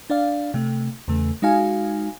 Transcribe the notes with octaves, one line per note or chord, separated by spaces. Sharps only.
D4 D5 F5
C3 A3
E2 C#3 A3
G#3 D#4 F#4 F5 G#5